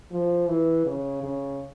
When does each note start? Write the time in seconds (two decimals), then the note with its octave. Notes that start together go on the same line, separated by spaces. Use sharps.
0.12 F3
0.49 E3
0.86 C#3
1.23 C#3